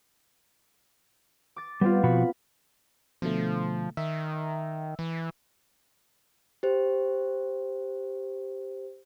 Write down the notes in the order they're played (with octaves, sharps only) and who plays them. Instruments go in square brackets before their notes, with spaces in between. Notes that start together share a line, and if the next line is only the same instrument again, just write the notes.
[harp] D6 A6
[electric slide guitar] G3 [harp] B3 C4 F4
[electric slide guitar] B2 F3 F#4 [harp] B5
[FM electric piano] B2 D3 A3 [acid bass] F3
[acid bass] D#3 [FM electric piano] E5
[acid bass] E3
[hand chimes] G4 C5